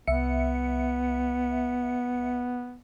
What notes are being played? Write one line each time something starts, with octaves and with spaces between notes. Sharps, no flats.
C2 B3 E5 C#7